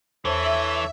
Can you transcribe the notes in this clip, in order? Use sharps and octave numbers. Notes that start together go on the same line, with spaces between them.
E2 E3 A4 C5 C#5 E5 A5